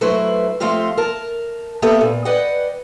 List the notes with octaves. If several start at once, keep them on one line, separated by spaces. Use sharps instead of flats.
F#3 A3 E4 B4 C5
F3 A3 C4 F4 G4
A#4 A5
A#3 B3 G4 A4 E5
A#2
B4 D5 D#5 F#5 G5